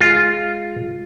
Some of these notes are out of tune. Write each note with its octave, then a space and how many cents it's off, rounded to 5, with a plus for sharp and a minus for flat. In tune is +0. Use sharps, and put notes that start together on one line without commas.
G#3 +0 F4 +0